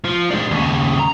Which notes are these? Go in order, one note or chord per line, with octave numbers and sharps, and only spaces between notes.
F3
G#3 D4
D#2 C#3
A#5